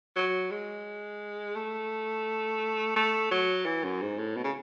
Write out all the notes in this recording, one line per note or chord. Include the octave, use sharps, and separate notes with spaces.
F#3
G#3
A3
A3
F#3
E3
F#2
G#2
A2
B2
C#3